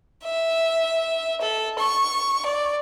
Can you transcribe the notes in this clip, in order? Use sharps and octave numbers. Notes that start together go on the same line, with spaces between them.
E5
A4
C#6
D5